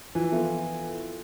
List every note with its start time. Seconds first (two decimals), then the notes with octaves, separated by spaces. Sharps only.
0.15 E3 F3
0.32 B3 F4 A4 E5